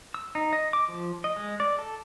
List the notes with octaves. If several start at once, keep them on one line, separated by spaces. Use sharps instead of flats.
E6
D#4
D#5
D6
F3
D#5
G#3
D5
A4